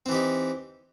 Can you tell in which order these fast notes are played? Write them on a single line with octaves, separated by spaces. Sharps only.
C4 E3 G4 D#4